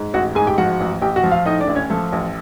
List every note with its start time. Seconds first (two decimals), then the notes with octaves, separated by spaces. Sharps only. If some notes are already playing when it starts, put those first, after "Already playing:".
Already playing: G#2
0.14 A1 F#4 F#5
0.35 G#2 G#4 G#5
0.47 G4 G5
0.58 F3 F#4 F#5
0.80 A1
1.02 A1 G4 G5
1.16 F#4 F#5
1.24 F3
1.31 F4 F5
1.46 A2 D#4 D#5
1.60 D4 D5
1.68 A1
1.75 C#4 C#5
1.90 F3 A3 A4
2.12 A1